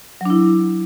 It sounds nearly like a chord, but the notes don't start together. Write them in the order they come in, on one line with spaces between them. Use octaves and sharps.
F#3 D4 E4